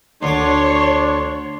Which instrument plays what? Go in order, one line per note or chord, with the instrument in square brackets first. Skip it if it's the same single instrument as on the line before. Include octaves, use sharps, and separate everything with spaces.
[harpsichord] D2 D6 [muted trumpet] D4 [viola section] C#5 [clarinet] C6